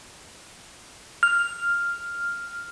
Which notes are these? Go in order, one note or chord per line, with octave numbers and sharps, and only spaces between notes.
F6